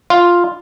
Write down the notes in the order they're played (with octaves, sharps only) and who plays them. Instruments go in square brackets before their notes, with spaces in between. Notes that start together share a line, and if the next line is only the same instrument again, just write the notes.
[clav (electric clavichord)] F4